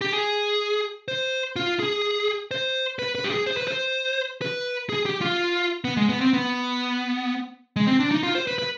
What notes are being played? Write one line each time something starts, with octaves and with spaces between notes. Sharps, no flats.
G4
G#4
C5
F4
G#4
C5
B4
B4
G4
G#4
C5
B4
C5
B4
G#4
G4
F4
B3
G#3
B3
C4
B3
G#3
C4
D4
D#4
F4
C5
B4
B4